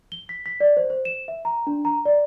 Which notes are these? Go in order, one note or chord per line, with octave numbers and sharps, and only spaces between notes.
G7
B6
B6
D5
C5
C5
E7
E5
A#5
D4
A#5
D5